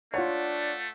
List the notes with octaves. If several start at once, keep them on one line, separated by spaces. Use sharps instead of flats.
A3 D4 F4 C#5 F#5